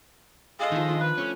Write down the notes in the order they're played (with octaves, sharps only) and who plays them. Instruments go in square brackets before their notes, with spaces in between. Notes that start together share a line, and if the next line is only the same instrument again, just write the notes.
[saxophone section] G#3 A4 D#5 [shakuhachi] F5
[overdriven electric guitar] D#3 [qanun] F3 D#4
[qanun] D4 F4
[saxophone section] B4
[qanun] A3 C6 [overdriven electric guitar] C#4